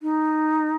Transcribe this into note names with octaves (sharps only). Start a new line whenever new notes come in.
D#4